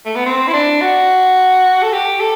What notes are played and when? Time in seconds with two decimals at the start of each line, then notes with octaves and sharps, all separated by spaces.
0.06 A3
0.15 B3
0.26 C4
0.48 E4
0.53 D4
0.81 F#4
1.82 A4
1.93 G4
2.20 A4